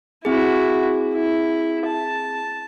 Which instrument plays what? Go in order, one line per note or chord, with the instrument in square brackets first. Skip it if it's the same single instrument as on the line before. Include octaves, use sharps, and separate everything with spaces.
[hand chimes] C4 G#4 [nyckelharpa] E4 F#4
[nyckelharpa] E4
A5